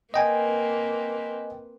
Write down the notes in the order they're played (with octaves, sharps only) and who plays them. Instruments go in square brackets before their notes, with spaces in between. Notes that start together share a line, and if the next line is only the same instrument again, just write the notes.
[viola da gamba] A#3 C4 B4 [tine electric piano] D#5 G5 G#5